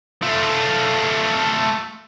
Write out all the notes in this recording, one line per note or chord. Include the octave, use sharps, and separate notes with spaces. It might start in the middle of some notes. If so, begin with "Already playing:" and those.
A3 F4